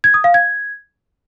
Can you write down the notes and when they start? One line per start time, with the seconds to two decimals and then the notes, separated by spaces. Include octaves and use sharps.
0.04 G#6
0.14 D#6
0.24 F5
0.34 G#6